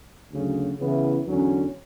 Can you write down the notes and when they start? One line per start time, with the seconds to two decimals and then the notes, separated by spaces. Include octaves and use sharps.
0.32 D2 C#3 F#3
0.79 C#3 E3 B3 E4 B4
1.27 E2 D3 F#3 C#4